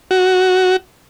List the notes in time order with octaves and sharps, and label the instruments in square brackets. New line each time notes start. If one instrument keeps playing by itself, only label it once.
[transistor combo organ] F#4